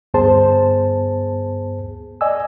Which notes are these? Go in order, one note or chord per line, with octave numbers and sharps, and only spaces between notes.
D2 G2 B3 G#4 C5 A5
D5 D#5 G#5 E6